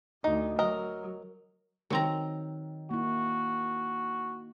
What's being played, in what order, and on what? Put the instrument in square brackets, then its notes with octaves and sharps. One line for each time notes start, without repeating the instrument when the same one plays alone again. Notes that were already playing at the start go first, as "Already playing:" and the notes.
[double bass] D2 [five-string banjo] D#4
[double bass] F#3 [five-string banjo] A#4 D#5
[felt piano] D#3 [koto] F#3 C4 A#5
[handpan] A#3 E4 [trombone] F#4